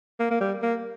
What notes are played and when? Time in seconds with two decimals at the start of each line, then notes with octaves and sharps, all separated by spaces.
0.20 A#3
0.31 A#3
0.41 G3
0.63 A#3